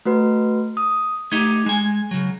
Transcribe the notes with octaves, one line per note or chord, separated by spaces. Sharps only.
A3 F#4 B4
D#6
A3 D#4 G4 G#6
G#3 G#5
C#3 F#3